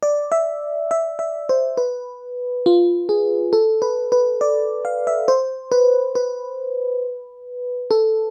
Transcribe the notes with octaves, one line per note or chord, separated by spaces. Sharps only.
D5
E5
E5
E5
C5
B4
F4
G#4
A4
B4
B4
D5
F5
E5
C5
B4
B4
A4